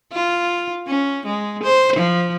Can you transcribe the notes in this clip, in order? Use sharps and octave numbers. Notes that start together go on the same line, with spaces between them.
F4
C#4
G#3
C5
F3